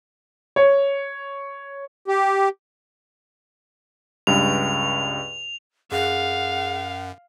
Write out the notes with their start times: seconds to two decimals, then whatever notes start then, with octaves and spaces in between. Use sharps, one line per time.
0.56 C#5
2.08 G4
4.27 C#2 G2 F7
5.92 F#2 G#4 F5 F#5